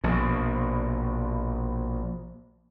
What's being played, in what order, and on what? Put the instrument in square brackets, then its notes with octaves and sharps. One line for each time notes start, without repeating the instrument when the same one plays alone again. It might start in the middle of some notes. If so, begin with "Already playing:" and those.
[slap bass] A#1 B2